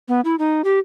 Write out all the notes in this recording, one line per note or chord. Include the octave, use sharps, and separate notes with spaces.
B3
E4
D#4
G4